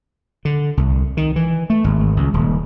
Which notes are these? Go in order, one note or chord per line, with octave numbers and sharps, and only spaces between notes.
D3
C2
D#3
E3
A3
G#1
C#2
D#1